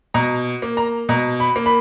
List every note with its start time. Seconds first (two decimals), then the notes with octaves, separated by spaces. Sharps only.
0.14 B2 A#5
0.62 A#3
0.77 A#5
1.09 B2 A#5
1.40 B5
1.56 A#3
1.66 B5